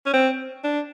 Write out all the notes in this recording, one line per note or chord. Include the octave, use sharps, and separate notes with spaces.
C#4
C4
D4